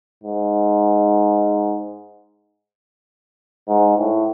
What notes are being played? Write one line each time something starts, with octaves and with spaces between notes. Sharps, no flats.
G#2
G#2
A2